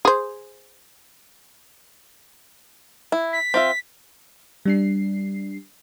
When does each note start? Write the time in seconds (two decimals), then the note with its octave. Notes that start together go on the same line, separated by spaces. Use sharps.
0.05 G#4 C5
3.12 E4
3.33 B6
3.54 C4 F4 E5
4.65 G3 D4 C7